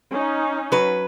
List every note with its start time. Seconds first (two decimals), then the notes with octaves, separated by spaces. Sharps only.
0.10 C#4 D#4
0.72 F#3 B4